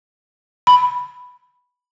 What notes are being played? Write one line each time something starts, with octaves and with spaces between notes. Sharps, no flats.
B5